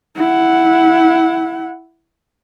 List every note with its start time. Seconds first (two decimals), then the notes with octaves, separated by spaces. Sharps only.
0.16 E4 F#5